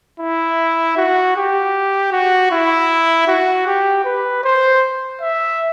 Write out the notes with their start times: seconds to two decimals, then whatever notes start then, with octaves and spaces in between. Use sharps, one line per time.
0.20 E4
0.97 F#4
1.36 G4
2.12 F#4
2.51 E4
3.28 F#4
3.67 G4
4.05 B4
4.44 C5
5.21 E5